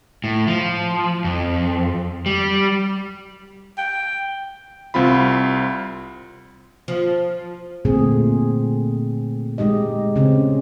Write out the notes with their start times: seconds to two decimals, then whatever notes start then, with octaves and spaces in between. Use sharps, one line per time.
0.24 A2
0.47 F3
1.24 F2
2.26 G3
3.78 G5
4.94 C2 C4 F4 B5
6.88 F3
7.85 A#2 D3 A3 C4 G#4
9.58 G#3 D#4 G4 D#5
10.16 C#3 C4 C#4